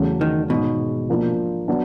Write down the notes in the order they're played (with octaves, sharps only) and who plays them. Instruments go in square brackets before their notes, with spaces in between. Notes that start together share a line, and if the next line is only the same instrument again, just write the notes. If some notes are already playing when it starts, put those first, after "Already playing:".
Already playing: [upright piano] E2 C#3 F#3 A3 C#4
[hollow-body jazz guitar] D#3
[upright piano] G#2 D#3 G#3 C#4 [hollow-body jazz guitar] B2
[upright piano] F3 A#3 D4 F4
F#3 B3 D4